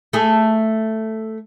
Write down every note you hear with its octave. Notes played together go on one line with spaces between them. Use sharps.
A3 G#4